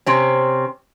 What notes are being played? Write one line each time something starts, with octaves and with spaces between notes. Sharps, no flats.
C3 C4 C#4